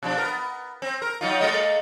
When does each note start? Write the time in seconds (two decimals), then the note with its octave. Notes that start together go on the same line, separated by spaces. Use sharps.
0.03 B2 F3 D4
0.17 B3 A#4
0.82 C4
1.02 A#4
1.21 F#3 D#4 F4
1.41 G#3 A#3 D#5